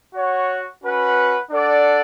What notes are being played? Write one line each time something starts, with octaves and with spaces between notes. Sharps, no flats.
F#4 C#5 F#5
C#4 F#4 B4 F#5
D4 A4 D5 F#5